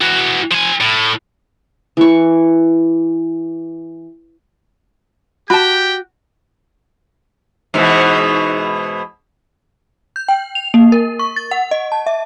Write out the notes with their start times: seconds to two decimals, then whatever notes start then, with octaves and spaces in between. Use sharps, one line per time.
0.01 E3 F#4
0.51 F3 G#5
0.80 A2
1.97 E3 C#6
5.50 F#4 G4 G5 A5 B5
7.74 G#2 B2 E3
10.16 G6
10.28 G5
10.55 F7
10.74 A#3
10.92 A#4
11.19 C#6
11.36 A6
11.51 F#5
11.71 D#5
11.92 A5
12.06 E5